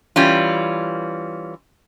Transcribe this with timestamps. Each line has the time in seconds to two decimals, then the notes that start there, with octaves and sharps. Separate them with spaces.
0.16 E3 G3 C#4 F4